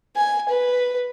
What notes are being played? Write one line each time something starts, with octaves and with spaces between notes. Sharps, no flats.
G#5
B4